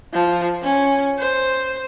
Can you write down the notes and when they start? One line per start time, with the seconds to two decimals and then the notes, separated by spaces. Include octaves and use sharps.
0.13 F3
0.63 C#4
1.18 C5